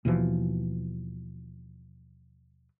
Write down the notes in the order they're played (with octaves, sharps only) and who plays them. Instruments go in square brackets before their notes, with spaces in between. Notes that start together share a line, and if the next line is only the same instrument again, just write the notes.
[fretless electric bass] D#2 B2 E3 F3